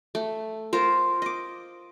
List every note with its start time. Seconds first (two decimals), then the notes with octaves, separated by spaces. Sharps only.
0.15 A3
0.73 F4 A#4 C5
1.22 D#5 D6